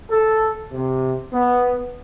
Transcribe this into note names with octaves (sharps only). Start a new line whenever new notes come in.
A4
C3
B3